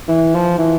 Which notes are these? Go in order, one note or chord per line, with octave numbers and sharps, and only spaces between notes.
E3
F3
E3